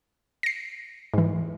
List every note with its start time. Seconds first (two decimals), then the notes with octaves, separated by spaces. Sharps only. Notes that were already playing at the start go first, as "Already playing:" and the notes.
0.43 A#6 C7
1.14 G#2 E3